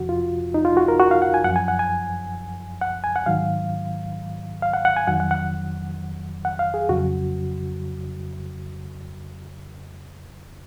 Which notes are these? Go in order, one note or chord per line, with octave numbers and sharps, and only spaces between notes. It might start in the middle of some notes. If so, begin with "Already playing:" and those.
Already playing: F2 C3 F3 F#4
F4
D#4
F4
F#4
A#4
F#4
F5
F#5
G#5
F#2 F3 F#5
G#5
F#5
G#5
F#5
G#5
F#5
G#2 D#3 F#3 F5
F5
F#5
F#5
G#5
F2 D#3 F#3 F#5
F#5
F#5
F#5
F5
G#4
F2 C#3 F#3 F#4